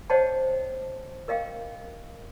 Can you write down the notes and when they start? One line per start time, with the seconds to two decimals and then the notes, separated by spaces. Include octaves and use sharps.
0.10 C5 C#5 D#5 F#5 G5 A5
1.28 A#4 D#5 F5 G5